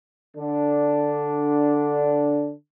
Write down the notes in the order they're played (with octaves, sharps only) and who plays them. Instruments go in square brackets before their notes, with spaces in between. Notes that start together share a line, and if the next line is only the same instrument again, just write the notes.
[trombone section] D3 D4